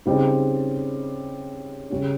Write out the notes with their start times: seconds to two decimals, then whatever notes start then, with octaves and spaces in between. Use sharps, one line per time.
0.06 C#3 G3 C4 D#4
1.90 C#3 G3 C#4